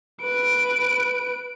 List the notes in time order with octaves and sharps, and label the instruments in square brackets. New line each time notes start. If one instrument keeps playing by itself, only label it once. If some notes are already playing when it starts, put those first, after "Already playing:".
[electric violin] B4 D7